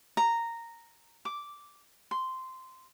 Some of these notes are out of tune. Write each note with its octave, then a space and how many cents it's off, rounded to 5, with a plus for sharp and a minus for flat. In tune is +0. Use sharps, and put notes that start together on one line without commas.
A#5 -10
D6 -5
C6 -10